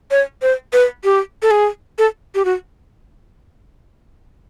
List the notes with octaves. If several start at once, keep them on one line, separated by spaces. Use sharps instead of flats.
C#5
C5
B4
G4
A4
G#4
A4
G4
F#4